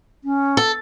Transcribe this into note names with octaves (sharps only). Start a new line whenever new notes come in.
C#4
A4